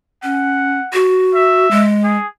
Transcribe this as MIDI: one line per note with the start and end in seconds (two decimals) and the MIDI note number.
0.23 0.80 61
0.23 0.95 78
0.93 1.69 66
1.35 1.83 76
1.71 2.17 56
2.03 2.27 68